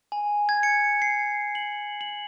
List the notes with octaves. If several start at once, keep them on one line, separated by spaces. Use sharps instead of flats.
G#5
G#6
C#7
C7
F#7
F#7